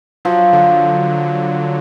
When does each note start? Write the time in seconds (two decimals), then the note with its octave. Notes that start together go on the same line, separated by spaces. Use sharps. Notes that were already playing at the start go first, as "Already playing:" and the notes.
0.25 F3 F#3
0.53 D3